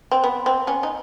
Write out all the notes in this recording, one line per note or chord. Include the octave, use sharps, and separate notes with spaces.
C4
B3
C4
B3 C#4
D#4